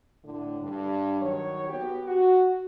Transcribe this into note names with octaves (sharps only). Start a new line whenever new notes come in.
A2 D3
G2
D#3 F#3 C#5
B3 F#4 G4
F#4